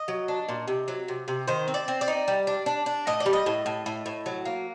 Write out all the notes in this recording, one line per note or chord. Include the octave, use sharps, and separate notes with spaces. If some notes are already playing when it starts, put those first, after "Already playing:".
Already playing: D#5
F#3
D4
A#2
C3
F#3
C3
C3
D#3 C5
C4
D5
C4
D5
D#4
G3
D4
D4
D4
A2 D#5
D5
G3
D#5
A2
A2
A2
A2
F#3
A#3